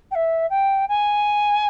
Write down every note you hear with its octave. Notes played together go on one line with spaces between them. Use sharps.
G5
E5
G5
G#5